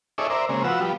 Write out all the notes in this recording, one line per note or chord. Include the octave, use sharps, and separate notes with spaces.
D#4 G#4 A4 C#5 D5 E5
A#4 C5 D5 E5
C#3 G#3 A#3 C4
F3 B3 F#4 E6
F3 G3 B3